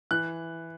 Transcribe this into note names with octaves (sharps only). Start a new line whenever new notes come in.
E3 F#6